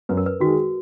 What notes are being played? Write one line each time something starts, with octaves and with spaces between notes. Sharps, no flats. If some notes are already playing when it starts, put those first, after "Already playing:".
F#2 B4
A#4
B4
D#3 G#3 F#4